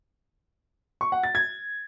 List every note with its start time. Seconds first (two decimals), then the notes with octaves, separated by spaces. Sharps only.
1.01 C#6
1.12 F#5
1.23 A6
1.35 G#6